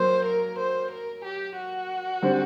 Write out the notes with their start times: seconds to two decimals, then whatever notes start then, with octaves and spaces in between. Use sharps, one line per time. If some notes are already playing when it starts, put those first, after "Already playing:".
Already playing: F#3 A#3 C5
0.25 A#4
0.59 C5
0.91 A#4
1.24 G4
1.57 F#4
2.22 D3 G3 C4